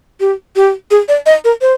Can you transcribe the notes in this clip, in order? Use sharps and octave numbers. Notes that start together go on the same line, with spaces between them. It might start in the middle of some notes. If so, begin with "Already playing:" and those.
G4
G4
G#4
D5
D#5
A#4
C5